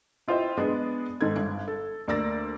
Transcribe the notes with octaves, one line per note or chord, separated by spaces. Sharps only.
E4 F4 G4 C5 D#5 E5
G#3 B3 D4 G#4
G#2 D#3 A4 G#6
G1
A4
D2 A#3 D5 E6 A6 A#6